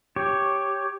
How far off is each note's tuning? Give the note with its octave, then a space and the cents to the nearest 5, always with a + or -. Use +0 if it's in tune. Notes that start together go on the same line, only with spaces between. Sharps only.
G4 +0 C#5 +0